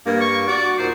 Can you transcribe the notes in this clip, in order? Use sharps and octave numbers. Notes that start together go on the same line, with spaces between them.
G2 A#3
C#6
F#4 D5
D#2 A#2 D#4 C5